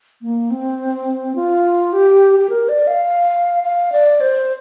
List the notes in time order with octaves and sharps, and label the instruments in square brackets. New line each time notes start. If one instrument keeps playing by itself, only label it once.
[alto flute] A#3
C4
F4
G4
G4
A#4
D5
F5
F5
D5
C5